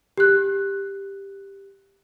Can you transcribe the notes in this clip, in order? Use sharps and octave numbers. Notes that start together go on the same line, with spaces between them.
G4 F#6